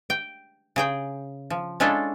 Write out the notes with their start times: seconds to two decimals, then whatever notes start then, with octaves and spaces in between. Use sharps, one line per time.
0.10 G5
0.76 C#3 G#4 G5
1.50 F3
1.80 G#3 C#4 D4 E4 F4 A4